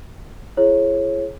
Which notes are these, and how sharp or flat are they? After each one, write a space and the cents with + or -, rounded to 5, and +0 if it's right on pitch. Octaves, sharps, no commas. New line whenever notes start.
E4 +45 G#4 +20 C#5 -25